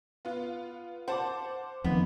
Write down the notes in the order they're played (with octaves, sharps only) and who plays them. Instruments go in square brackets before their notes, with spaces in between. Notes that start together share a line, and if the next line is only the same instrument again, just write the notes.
[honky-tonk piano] B3 F4
[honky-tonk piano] C5 A5 D6 [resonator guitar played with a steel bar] F#5
[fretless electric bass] F2 D#3 A#3 [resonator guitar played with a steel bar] B3